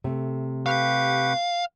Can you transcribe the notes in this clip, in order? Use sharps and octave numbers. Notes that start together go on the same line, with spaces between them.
C3 A3
G4 B4 F5 C#6